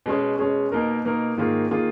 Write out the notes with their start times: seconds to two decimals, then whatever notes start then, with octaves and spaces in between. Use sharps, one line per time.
0.06 B2 G#3 C#4 G#4
0.39 B2 G#3 C#4 G#4
0.72 B2 A#3 D#4 A#4
1.05 B2 A#3 D#4 A#4
1.37 G#2 D#3 A#3 F4 G#4
1.71 D#3 A#3 F4 G#4